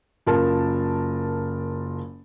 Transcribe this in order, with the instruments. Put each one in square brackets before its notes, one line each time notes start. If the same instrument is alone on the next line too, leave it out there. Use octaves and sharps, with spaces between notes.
[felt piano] F#1 F4 A#4 A5